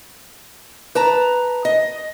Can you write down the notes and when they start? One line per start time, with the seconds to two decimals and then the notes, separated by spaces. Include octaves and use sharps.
0.95 B4 A5 A#5
1.65 D#5